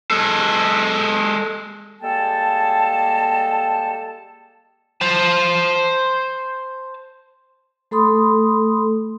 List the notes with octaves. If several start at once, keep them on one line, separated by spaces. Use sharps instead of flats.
G#3 A4
G3 G#3 A#3 A4 G5 A5
C5 A5
A3 A4 B5 C6 D#6